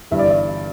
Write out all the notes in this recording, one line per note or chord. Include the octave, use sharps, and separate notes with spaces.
G1 G2 E3 E5
D5
E5